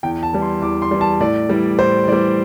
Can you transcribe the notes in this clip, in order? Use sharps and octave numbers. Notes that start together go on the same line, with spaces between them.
E2 G5
A5
E3 G3
C6
E2 D6
C6
E3 G3
A5
A2 D5
E3 G3
A2 C5
E3 D5
G3